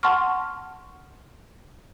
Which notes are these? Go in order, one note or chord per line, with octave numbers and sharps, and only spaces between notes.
F#5 A5 C6 C#6 F6